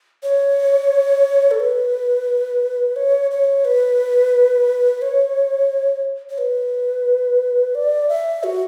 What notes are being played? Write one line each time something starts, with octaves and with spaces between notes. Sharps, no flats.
C#5
A4
B4
C#5
C#5
B4
C#5
C#5
B4
D5
E5
F#4